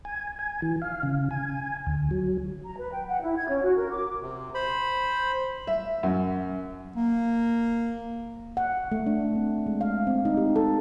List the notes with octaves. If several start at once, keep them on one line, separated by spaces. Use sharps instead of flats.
G#5
G#5
E3
F5
C#3
G#5
D2
F#3
A#5
B4
G5
F#5
E4
G#6
C#4
F#4
A#4
D6
C3
C5 B5
E5
F#2
A#3
F#5
A3
D4
C4
G#3
F5
C4
D#4
G4
A4